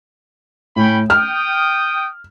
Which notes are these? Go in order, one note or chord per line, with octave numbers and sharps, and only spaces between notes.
A2 C#4 G5 B5
G5 D#6 F6